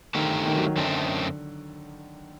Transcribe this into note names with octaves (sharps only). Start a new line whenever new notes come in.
D3 D#3 A3 C4 G4 A#4
D#3
F#3
F#3
F#2 D3 D#3 A3 C4